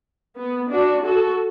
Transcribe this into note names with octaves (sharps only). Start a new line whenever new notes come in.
B3
D4 F#4
F#4 A4